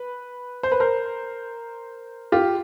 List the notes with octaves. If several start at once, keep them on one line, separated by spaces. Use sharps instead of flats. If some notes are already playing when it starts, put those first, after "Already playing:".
Already playing: B4
C5
B4
A#4 C5
F4 G4